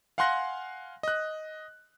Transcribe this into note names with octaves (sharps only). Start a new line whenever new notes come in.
F5 F#5 G#5 C6 F#6 A#6
D#5 F#6